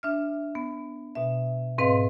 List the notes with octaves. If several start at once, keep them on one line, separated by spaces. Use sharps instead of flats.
D4 E5 F6
B3
B2 E5
G#2 C4 B4 D#5 F5